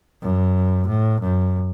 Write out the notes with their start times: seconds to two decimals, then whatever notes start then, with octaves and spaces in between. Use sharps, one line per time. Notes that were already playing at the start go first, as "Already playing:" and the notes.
0.22 F#2
0.87 A2
1.21 F#2